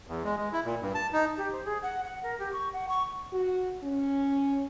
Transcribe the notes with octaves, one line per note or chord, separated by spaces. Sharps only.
E2
G#3
G#3
E4
A#2
G2
A5
D#4
G4
C5
G#4
F#5
F#5
A#4
G4
C#6
F#5
C#6
F#4
C#4